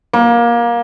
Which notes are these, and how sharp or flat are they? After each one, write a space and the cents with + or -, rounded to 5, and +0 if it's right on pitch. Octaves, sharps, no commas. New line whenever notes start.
A#3 +20